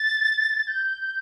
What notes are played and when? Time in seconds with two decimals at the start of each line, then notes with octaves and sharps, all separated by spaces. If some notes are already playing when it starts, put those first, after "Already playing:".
Already playing: A6
0.68 G6